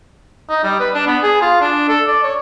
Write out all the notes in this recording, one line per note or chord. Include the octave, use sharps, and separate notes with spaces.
D#4
G3
B4
D4
B3
G#4
F4
D4
A4
D5
C#5